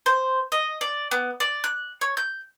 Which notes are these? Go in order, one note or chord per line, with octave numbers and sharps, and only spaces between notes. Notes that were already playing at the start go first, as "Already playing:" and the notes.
C5
D#5
D5
B3
D5
F#6
C#5
G6